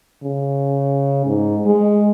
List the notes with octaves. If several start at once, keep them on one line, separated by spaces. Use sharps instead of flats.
C#3
G#2
G#3